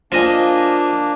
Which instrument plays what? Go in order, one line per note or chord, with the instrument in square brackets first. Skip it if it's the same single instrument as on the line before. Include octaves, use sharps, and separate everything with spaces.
[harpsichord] F3 D#5 G#5 [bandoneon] A#3 D4